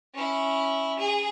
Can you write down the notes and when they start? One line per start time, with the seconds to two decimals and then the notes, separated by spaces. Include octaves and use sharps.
0.14 C#4 E4
0.99 G#4